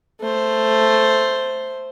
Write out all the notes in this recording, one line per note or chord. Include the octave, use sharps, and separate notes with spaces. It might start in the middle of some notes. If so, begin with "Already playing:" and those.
A3 C5